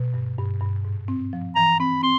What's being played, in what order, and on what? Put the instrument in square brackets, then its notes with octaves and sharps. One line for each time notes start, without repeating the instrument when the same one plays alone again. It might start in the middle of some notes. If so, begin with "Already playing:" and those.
Already playing: [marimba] B2
G2
G2
G2
G#2
C4
F3
[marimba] E3 [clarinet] A#5
[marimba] C4 [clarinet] B5
[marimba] C4 [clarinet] C6